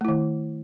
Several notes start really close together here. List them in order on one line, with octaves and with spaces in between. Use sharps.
A3 E4 D#3